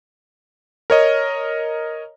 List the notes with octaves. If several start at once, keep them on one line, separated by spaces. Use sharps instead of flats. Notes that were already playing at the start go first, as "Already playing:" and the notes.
A#4 C#5 D#5